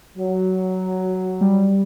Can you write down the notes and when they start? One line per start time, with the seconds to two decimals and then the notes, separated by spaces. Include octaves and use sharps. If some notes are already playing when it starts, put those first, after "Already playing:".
0.18 F#3
1.41 G3